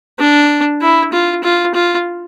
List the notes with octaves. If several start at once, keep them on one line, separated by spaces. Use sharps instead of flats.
D4
E4
F4
F4
F4